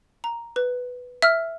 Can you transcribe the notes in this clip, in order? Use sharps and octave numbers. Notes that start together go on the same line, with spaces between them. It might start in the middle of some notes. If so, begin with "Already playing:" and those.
A#5
B4
E5 E6 F6